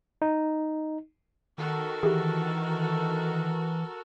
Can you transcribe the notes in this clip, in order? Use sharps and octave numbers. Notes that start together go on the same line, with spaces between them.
D#4
D#3 F#4 A4 A#4
E3 G4 G#4